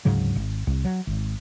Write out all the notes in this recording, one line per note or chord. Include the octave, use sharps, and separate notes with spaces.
D1 G#2 C#3 F#3
G#1
C2
F#3
G#1